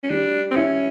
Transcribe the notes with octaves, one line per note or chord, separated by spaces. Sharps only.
C#4
G3 D4
C4
C#4 E4